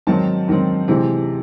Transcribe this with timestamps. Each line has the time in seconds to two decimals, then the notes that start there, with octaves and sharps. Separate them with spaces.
0.07 G#2 D#3 F#3 C4 A5
0.48 G#2 D#3 F#3 C4
0.88 C3 E3 G#3 C4